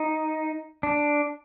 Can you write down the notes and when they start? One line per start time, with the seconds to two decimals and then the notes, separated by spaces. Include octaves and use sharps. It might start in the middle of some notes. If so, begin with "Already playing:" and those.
Already playing: D#4
0.83 D4